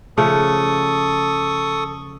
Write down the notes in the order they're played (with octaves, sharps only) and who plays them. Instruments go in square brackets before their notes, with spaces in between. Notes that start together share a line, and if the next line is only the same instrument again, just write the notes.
[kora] C#3 F3 A3 [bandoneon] A4 C#6 D#6